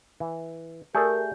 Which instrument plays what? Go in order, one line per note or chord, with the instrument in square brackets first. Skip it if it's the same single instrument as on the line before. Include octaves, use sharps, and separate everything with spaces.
[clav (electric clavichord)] E3
[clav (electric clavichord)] A3 G#4 [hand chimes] G4 G6 [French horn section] A#4 [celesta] D5 G#5